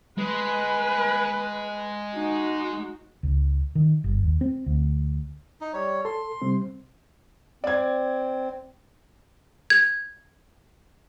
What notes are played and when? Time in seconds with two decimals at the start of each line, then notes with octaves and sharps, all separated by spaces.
0.18 G#3 B4
2.14 D#4 F#4
3.23 C#2
3.75 D#3
4.04 G1
4.23 D#2
4.41 C4
4.66 D2
5.61 D#4
5.73 G3 C#5
6.05 A4 C6
6.42 C3 G3 C4
7.64 C4 D5 G#6
9.70 G#6